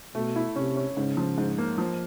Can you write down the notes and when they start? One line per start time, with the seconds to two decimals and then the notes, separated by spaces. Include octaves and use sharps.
0.15 B2 A3
0.36 E4
0.56 C3 C#4
0.76 C#4
0.97 G#2 C#3
1.17 F3
1.38 G#2
1.58 A#3
1.78 F3